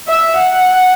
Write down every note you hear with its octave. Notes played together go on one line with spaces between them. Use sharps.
E5
F#5